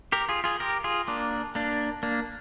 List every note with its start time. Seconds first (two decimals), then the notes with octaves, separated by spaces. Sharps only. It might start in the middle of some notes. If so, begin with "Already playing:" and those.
0.12 G4 A#4
0.29 F4 G#4
0.44 F4 G#4
0.60 G4 A#4
0.84 F4 G#4
1.08 A#3 D4
1.55 A#3 D4
2.03 A#3 D4